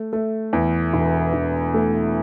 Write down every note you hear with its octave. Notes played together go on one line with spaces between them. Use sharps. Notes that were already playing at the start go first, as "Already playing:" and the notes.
Already playing: A3
A3
E2
E1
E1
A3